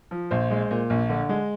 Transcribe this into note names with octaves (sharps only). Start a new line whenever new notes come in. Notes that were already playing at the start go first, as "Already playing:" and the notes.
F3
A#1 C5
G#3
A#2
A#1
D3
G#3